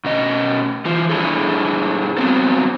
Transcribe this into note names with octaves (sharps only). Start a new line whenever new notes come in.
B2 C#4 D#5
E3 F4
G2 D3 D4 E4 G#4 A4
F#3 G3 B3 C4 A4